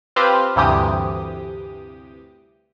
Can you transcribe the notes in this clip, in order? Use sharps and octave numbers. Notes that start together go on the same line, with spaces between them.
C4 F4 G4 B4 C5 F5
D2 G2 C3 E3 G4 D#6